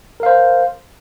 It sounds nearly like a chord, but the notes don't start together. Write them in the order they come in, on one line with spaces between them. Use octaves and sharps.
A#4 F5 C5